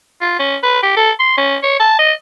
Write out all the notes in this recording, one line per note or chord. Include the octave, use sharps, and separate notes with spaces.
F4
C#4
B4
G4
A4
C6
C#4
C#5
A5
D#5